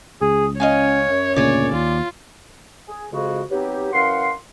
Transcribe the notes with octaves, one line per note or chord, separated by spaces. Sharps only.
C#2 G#4
C#4 C#5 D#5 F5 G#5
F#2
D2 A#2 C#3 C#5 D5 G#5
D#2 F4
G#4
F2 C#3 G#3 F#4
F#3 B3 C4 D#4 G4
F#2 E3 F5 F#5 C6